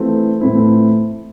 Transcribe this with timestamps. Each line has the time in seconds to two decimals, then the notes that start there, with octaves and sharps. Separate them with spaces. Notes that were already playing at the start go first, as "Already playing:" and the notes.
Already playing: E3 A3 C4 F4
0.41 A2 E3 A3 C4 E4